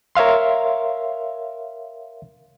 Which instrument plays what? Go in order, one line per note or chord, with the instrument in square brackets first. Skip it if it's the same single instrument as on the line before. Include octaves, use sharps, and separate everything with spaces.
[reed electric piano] A#4 C#5 E5 F5 C6